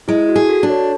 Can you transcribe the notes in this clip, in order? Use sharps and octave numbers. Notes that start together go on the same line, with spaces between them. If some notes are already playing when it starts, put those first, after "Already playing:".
G#3 E4
F#4
G#4
F#4 A4
D4
A4 C#5